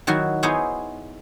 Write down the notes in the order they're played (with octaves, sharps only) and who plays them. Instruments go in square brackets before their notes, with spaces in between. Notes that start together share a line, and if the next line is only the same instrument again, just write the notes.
[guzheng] D#3 F#3 E4 F#4
B3 D#4 E4 G#4 C5 C#5